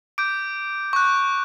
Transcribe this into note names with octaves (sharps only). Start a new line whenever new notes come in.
D6 G6 D7
C#6 F#6